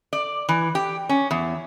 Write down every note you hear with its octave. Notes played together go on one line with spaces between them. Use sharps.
D5
E3
G4
C#4
E2